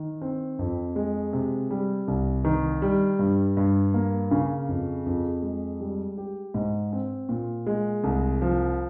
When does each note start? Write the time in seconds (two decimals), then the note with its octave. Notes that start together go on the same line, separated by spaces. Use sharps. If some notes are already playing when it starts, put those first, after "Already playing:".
Already playing: D#3
0.22 C4
0.59 F2
0.96 G#3
1.33 C3
1.70 G3
2.08 C2
2.45 D#3
2.82 G3
3.19 G2
3.57 G2
3.94 A#3
4.31 C#3
4.69 F2
5.06 F2
5.42 G#3
5.80 G3
6.18 G4
6.54 G#2
6.93 C4
7.29 A#2
7.66 G#3
8.04 C2
8.42 F3